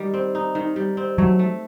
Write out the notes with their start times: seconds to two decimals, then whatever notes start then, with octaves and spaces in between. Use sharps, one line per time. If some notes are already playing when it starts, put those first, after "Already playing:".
Already playing: D#3 G3
0.14 C4
0.35 D#4
0.55 D#3
0.76 G3
0.97 C4
1.18 F#3 A3
1.39 A3